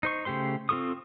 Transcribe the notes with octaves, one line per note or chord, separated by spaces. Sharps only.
D#4 C5 C#6
C#3 A3 G4 C5 C6
C4 F4 A4 C#6 D#6